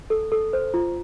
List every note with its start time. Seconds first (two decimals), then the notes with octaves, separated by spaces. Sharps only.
0.10 A4
0.32 A4
0.53 C5
0.74 F4